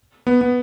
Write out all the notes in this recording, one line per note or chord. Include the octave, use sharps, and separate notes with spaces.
B3
B3